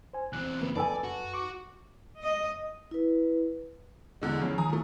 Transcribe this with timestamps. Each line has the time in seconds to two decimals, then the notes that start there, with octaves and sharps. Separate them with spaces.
0.13 C5 G#5
0.33 E2 C4 F#6
0.61 C#3 F3 A#3 B4
0.76 F#2 D#4 A4 B4 D5 G#5 A5
1.04 F#4
1.34 C#6 D6
2.20 D#5
2.91 E4 B4
4.21 E2 D3 G#3
4.41 E2 C#3 F3
4.58 D#3 G#5 A#5 D#6
4.69 F3 A3